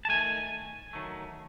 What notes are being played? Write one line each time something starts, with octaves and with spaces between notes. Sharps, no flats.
A5
F#3 A3 G#5
D#3
D#3 F#3 A3